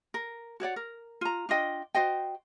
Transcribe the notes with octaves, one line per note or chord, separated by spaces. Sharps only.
A#4
F#4 C#5 D5 F#5
A#4
F4 A#5
D4 F4 D#5 G5
F#4 C5 D#5 G5